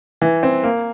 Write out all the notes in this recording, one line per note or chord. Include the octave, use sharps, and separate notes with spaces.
E3
C4
A#3